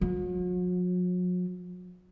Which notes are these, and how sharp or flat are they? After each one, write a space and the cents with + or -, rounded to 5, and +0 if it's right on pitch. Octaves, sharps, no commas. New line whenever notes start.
F#3 -45